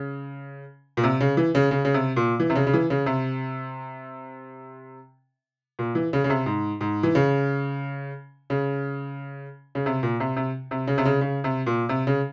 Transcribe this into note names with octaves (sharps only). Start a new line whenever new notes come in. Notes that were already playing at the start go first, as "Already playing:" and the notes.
Already playing: C#3
A#2
C3
C#3
E3
C#3
C#3
C#3
C3
A#2
E3
C3
C#3
C#3
E3
C#3
C3
A#2
E3
C#3
C#3
C3
G#2
G#2
E3
C#3
C#3
C#3
C3
A#2
C3
C3
C3
C#3
C3
C#3
C#3
C3
A#2
C3
C#3